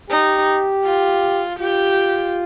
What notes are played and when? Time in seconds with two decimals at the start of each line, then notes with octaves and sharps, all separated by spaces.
0.10 D#4 G4
0.85 F4
1.60 F4 G4